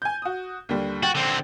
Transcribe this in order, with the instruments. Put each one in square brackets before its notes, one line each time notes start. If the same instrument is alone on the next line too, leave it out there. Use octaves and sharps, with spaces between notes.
[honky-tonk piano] G#5 G6
F#4 D#6
D#2 D3 G3
[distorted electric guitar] F#4 [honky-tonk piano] G5 A6
[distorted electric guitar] D3 C4